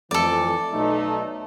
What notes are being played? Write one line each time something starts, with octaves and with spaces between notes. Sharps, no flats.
F2 E3 A3 A4 D5
B1 A3 D#4